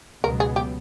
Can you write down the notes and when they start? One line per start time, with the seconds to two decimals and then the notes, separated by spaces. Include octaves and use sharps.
0.23 C#2 B2 F#3 B3 A#4
0.40 G#4
0.56 G4